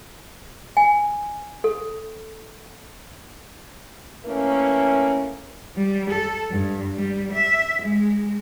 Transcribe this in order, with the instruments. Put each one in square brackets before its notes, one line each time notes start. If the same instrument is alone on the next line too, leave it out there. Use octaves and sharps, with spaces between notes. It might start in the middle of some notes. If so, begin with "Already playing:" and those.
[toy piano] G#5
A4
[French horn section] E3 A3 A#3 C#4
[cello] G3
A4
G2
G3
E5
G#3